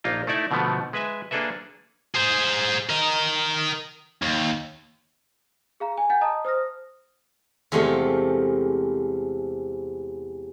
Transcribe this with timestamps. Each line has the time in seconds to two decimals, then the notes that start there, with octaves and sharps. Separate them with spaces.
0.04 A#1 A#3 D#4 F4 D#5
0.27 A3 D#4 E4 D5 E5
0.51 B2 D3 F3 A3 B3
0.93 G#3 B4 E5 G#5
1.31 A#3 D4 G#4 A4 B4 E5
2.15 G#4 C5
2.89 A#4 D#5
4.22 D#2
5.80 G#4 F5 A#5
5.98 G#5
6.10 F#5 G#5 G6 A6
6.21 D#5 A5 A#5 D#6
6.45 C5 D#6 F6 A#6
7.72 E2 C3 G#3 A3 F4 G4